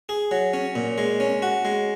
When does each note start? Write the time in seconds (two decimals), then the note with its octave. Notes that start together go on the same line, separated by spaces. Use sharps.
0.09 G#4
0.31 F#3
0.54 C#4
0.75 A#2
0.98 G#3
1.20 C#4
1.42 F#4
1.65 G#3